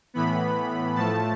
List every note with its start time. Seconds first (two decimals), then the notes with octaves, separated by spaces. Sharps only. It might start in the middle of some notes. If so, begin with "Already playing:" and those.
0.14 A2 E3 B3 B5
0.95 A2 F3 A3 A5